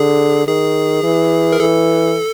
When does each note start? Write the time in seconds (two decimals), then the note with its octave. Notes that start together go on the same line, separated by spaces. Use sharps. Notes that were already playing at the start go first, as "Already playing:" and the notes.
Already playing: D3 G#4
0.47 D#3 G#4
1.03 E3
1.52 A#4
1.59 E3 A4